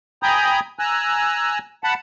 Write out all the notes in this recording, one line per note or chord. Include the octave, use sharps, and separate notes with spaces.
G5 G#5 A#5 B5 D#6 G6
G#5 A#5 E6 F#6
F#5 A5 B5